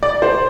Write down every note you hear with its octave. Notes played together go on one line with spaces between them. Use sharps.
D5
C5